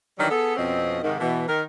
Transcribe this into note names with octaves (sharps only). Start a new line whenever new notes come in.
D#3 E3 F#3 G3 D4
B3 G#4 A4
F2 B2 C4 C#4 D#5
G#2 C3 D#3
B2 E3
D#3 A#4